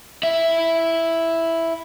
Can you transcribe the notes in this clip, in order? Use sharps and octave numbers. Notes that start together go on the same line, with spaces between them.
E4 E5